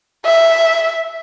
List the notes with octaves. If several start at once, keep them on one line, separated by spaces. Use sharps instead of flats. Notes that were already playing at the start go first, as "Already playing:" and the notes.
E5